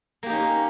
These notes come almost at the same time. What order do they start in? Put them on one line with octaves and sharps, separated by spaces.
A#3 G4 D#4 C#4